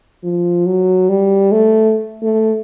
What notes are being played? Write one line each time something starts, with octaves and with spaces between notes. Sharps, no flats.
F3
F#3
G3
A3
A3